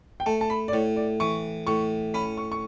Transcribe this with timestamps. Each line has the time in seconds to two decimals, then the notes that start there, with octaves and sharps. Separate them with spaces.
0.20 G5
0.26 A3 A5
0.41 A5
0.50 B5
0.68 D5
0.73 A2 C#5
0.96 D5
1.20 E3 C#6
1.67 A2 C#6
2.14 C#4 B5
2.37 C#6
2.52 C#6